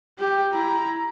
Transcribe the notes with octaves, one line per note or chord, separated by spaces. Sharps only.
G4
E4 A#5